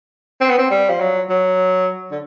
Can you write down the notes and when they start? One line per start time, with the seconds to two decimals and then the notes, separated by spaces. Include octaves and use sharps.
0.41 C4
0.50 B3
0.58 C4
0.71 G3
0.90 F3
1.00 F#3
1.30 F#3
2.11 D3